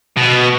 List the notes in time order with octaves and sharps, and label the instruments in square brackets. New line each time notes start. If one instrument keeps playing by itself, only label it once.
[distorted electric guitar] B2